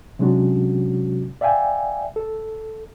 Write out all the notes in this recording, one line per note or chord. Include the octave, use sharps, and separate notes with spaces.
C3 F#3 G#3 C#4 D4 F#4
D5 E5 F5 G5 G#5
A4